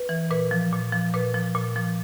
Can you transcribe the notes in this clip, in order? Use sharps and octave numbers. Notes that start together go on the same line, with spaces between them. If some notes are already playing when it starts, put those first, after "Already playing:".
Already playing: B4
E3
A#2 B4
F3
A#2
F3
A#2 B4
F3
A#2
F3